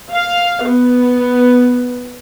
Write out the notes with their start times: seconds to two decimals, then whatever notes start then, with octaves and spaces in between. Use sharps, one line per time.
0.12 F5
0.67 B3